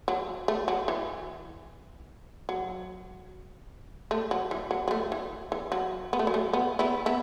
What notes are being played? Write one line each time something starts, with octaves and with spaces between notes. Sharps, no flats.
F#3
A3
F#3
E3
F#3
A3
F#3
E3
F#3
F#3
A3
E3
E3
F#3
B3
A3
F#3
A3
B3
B3 E4
B3 E4